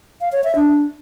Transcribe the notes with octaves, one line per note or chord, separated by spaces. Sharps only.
F5
C#5
E5
D4